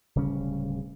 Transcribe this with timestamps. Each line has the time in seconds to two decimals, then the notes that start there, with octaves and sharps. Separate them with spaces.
0.15 D1 C#3 G3 C#4